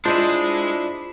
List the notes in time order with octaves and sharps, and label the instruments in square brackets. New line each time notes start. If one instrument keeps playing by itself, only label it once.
[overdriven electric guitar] G#3 G#4 [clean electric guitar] D4 E4 [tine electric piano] F4 [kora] C5 D#5